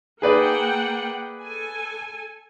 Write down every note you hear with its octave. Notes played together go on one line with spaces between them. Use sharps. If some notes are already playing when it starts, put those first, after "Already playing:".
A#3 G#4 B4 D5 F#5 G5
A4 G#5